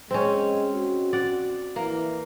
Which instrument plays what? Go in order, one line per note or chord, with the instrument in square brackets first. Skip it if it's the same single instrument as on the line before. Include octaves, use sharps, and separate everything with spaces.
[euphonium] G#3 [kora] C4 C#4
[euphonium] F#4
[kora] D5 F#5
[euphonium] E3 [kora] A#3